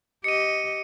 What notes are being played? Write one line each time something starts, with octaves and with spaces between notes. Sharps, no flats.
G4 D#5 C#7 D#7